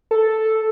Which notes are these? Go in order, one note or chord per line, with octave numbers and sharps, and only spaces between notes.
A4